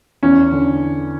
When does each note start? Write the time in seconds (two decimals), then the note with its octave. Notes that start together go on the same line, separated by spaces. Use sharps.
0.23 E2 C#4
0.52 D3